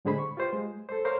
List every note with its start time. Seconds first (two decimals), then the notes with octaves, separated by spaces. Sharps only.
0.05 A2 D3 G#3 G#4 C5 B5
0.18 C#6
0.37 F4 G4 B4 C5
0.53 G#3
0.89 A4 C5
1.05 A#4 C5 C#5 F5 C6 F6